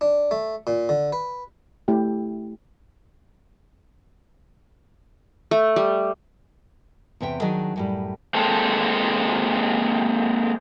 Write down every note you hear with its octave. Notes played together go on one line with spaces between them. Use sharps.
D4
A3
A#2
D3
B4
A3 E4 G4
A3
G3
E2 C3 E5 G5
D#3 F#3 D4 G#4 D#5
F#2 A2 G3
G#3 A#3 C4 A4